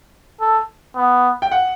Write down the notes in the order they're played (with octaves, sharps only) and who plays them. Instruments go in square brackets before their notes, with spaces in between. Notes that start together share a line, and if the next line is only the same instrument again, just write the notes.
[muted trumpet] A4
B3
[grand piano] G5
F#5